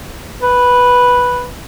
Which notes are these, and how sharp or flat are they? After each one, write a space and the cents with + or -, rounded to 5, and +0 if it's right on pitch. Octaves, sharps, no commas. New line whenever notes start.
B4 -5